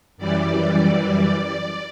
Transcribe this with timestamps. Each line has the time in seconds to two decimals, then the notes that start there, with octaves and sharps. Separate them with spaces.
0.17 F#2 E3 G3 D5